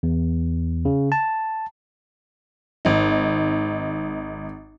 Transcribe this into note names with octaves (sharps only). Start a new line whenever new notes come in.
E2
C#3
A5
G#1 D#4